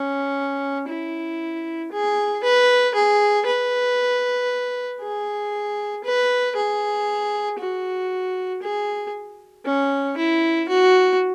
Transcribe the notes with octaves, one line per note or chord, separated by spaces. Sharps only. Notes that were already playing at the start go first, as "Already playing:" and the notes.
Already playing: C#4
E4
G#4
B4
G#4
B4
G#4
B4
G#4
F#4
G#4
C#4
E4
F#4